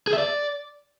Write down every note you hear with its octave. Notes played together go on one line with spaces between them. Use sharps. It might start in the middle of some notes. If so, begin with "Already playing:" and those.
G#4
E5
D5